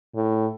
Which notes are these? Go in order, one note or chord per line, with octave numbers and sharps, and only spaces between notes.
A2